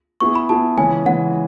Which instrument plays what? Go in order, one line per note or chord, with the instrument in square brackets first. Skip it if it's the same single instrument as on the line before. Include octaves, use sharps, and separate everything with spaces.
[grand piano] B3 E4 G#4 [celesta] C#6
[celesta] B5
[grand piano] B3 E4 G#4 [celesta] A5
[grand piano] C#3 E3 G#3 C#4 [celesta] G#5
[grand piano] C#3 E3 G#3 C#4 [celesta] F#5